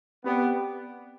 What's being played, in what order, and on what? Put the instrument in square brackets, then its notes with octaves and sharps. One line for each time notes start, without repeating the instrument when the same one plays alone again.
[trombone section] B3 [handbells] C4 G4 D5 G5